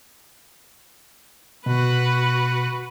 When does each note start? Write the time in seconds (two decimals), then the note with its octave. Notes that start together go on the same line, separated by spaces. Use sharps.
1.66 B2 F#4 B4